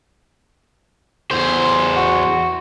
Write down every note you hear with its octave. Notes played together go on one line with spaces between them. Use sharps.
E2 C5
F#4